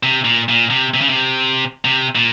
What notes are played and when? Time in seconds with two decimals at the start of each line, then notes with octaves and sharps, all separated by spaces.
0.03 C3
0.25 A#2
0.49 A#2
0.70 C3
0.94 C3
1.01 C#3
1.09 C3
1.85 C3
2.15 A#2